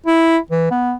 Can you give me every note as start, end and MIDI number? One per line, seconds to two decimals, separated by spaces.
0.07 0.38 64
0.51 0.66 52
0.71 0.93 59